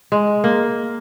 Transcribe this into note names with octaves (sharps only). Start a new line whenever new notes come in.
G#3
A#3